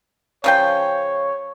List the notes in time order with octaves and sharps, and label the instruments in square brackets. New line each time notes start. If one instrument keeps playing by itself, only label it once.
[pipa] C#3 F3 G5 [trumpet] C#5